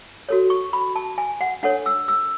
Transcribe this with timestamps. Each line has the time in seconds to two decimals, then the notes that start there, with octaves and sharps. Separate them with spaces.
0.29 F#4 A4 C#5
0.50 C#6
0.73 B5
0.95 A5
1.18 G#5
1.41 F#5
1.63 D4 A4 C#5 F#5
1.86 E6
2.08 E6